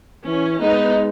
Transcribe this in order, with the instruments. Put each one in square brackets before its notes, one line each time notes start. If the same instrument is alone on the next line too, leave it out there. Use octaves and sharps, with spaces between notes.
[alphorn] E3 [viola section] C#4
[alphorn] G#3 [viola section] B3 D#4